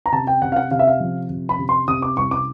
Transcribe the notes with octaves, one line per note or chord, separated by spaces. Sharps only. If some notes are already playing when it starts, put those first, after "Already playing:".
A#5
C3 A5
G5
C3 F#5
F5
F#5
C3 F5
E5
F5
F3
C3
B5
C3
C6
C3 D#6
D6
C2 C#6
D6